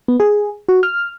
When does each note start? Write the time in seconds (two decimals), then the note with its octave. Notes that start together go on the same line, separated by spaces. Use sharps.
0.08 B3
0.20 G#4
0.68 F#4
0.83 F6